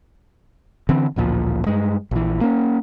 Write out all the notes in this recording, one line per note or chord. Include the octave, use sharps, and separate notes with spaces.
D3 E3 C4
A1 D2 A#2 F3
G2 G#3
A#1 E3
A#3 C#4